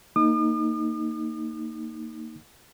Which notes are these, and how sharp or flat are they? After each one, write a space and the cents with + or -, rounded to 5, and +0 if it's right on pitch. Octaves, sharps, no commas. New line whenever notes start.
A#3 -15 D#4 +0 D#6 -45